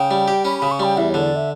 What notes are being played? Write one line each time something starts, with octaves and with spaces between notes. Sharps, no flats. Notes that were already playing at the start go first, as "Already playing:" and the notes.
Already playing: C#3 G5
G3
G4
C#4 B5
C#3 B5
C#6
G3 G5
E2 E5
D3 C#5
D5
E5